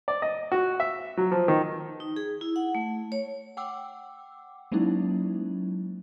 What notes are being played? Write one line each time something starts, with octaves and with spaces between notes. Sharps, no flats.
D5
D#5
F#4
E5
F#3
F3
D#3
D#4
G#4
E4
F#5
A3
C#5
F#5 G5 D6 E6
F#3 G#3 A#3 C#4 D#4 E4